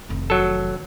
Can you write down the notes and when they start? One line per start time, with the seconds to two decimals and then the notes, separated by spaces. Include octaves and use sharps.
0.09 F1 D#3
0.30 F#3 A4